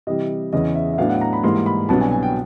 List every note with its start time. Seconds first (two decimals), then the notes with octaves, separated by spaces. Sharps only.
0.07 C3 E3 G3 D#5
0.53 E2 C#3 E3 D#5
0.75 E5
0.94 E5
0.98 A2 F#3 B3 D4 F5
1.09 F#5
1.21 A#5
1.33 B5
1.43 G#2 E3 G3 A#3 C6
1.66 B5
1.89 C2 B2 F#3 B3 D4 A5
2.01 G#5
2.12 G#5
2.23 G5